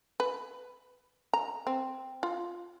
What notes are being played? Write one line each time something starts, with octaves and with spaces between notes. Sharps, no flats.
B4
A#5
C4
F4